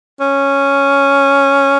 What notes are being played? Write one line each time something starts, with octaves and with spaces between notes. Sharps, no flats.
C#4